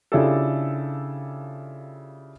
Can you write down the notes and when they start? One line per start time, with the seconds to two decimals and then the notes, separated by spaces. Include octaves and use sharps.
0.12 C#3 D4 E4 F4 G4 A4